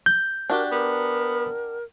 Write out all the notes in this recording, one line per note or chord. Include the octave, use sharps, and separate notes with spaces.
G6
D4 F#4 G4 A#4
B3 A#4